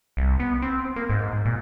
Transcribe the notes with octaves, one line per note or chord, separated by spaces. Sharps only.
C2
B3
C4
A#3
G#2
A#2